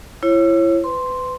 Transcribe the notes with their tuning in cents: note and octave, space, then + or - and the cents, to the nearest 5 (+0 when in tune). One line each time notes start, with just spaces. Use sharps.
E4 +30 C#5 -25
B4 +30 C6 +0